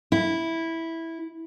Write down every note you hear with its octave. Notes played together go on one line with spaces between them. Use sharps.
E4